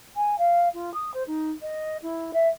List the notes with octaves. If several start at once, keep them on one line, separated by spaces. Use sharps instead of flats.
G#5
F5
F4
D#6
C5
D#4
D#5
E4
E5